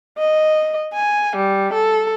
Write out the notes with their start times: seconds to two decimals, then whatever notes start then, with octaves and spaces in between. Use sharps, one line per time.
0.18 D#5
0.94 G#5
1.36 G3
1.74 A4